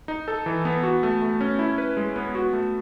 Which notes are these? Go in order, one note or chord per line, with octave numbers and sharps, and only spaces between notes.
D#4
A4
E3
B3
F#4
A3
A3
C#4
E4
B4
G#3
B3
F#4
A3